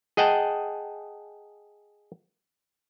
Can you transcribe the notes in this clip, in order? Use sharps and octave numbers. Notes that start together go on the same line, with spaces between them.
G#4 D#5 F#5 G5 A5